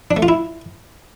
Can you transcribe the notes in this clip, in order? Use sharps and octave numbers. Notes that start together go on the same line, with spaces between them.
D4
A3
F4
E4